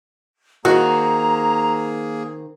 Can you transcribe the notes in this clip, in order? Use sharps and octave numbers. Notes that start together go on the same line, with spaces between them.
D#3 A#3 C4 F#4 G#4 A#5